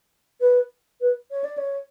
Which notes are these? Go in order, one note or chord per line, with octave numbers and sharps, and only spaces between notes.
B4
B4
C#5
D5
C#5